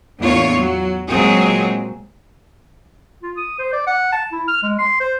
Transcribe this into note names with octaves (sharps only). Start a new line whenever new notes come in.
E2 A2 A#3 D4 F4 C#5
F#3
A#2 F#3 G#3 C4 G#4
F4
D#6
C5
D5
F#5
A5
E4
F6
G#3
C6
C5